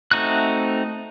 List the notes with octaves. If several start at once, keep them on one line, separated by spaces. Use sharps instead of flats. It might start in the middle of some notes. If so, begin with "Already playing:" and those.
A3 C4 D#4 F#4 F#6